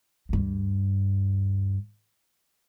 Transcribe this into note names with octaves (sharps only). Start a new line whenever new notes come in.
D2 G2